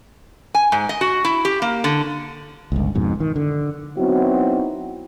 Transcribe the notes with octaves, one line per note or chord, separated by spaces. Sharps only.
G#5
G#2
D#5
F#4
E4
G4
A#3
D3
G1 C#2
F2 G#2 B2
D#3
D3
F#3 B3 C4 D#4 E4 F#4